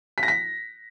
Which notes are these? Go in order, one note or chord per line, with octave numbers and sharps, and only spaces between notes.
B6
A#6
B6